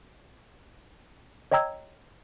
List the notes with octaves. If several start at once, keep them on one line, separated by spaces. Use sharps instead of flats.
C#5 D#5 G5 A#5 E6 G#6